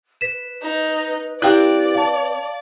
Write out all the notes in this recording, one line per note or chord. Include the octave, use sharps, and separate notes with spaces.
B4 B6 E7
D#4
C4 E4 G4 D5 F5 F#6
F5 A5